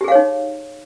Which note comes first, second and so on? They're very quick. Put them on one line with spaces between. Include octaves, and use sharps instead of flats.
G4 G#4 F5 C#5 D#4